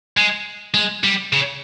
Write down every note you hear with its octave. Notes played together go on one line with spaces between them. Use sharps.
G#3
G#3
G3
C#3